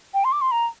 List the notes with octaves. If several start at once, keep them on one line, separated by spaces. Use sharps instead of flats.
G5
C6
D6
C6
A#5